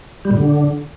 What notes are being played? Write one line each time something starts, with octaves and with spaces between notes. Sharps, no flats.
G3
A#2
D3